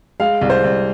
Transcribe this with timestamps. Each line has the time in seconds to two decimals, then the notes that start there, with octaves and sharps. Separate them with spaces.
0.20 G#3 F5
0.41 C2
0.50 C5
0.64 C2